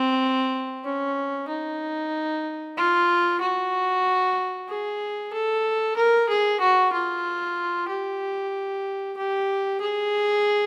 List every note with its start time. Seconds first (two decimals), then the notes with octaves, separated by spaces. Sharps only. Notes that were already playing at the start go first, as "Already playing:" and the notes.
Already playing: C4
0.84 C#4
1.48 D#4
2.77 F4
3.41 F#4
4.68 G#4
5.33 A4
5.96 A#4
6.29 G#4
6.61 F#4
6.92 F4
7.88 G4
9.17 G4
9.81 G#4